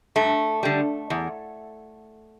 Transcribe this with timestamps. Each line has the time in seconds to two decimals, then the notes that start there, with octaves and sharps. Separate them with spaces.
0.16 G2 A3
0.63 D3 G3
1.10 E2